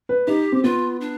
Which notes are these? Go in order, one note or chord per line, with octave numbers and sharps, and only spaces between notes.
B4
D#4 G4
C4
B3 F4
D4